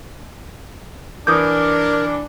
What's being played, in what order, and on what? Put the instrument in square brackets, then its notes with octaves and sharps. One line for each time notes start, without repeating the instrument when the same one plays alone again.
[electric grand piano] E3 D6 [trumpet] D4 [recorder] A#4 [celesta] D#6 G6